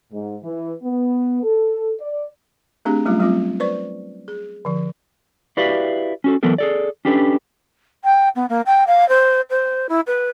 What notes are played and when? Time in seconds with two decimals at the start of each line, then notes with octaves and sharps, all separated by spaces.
0.11 G#2
0.43 E3
0.83 B3
1.43 A4
2.00 D5
2.85 A3 C4 D4 G4 G#4
3.05 F#3 G3 A3 C#4 F4
3.19 F#3 G3 A3 C4 F4
3.60 B4 C5 D5 C#6
4.28 G#4
4.65 D3 F3
5.57 E4 F#4 G4 B4 D5 F5
6.24 C#4 F#4 A4
6.43 E3 F#3 B3 A4 A#4
6.58 G#4 A4 D5
7.05 C#4 D4 G4 A4 B4
8.04 G5
8.35 B3
8.49 A#3
8.66 G5
8.87 F5
9.08 C5
9.50 C5
9.89 E4
10.07 B4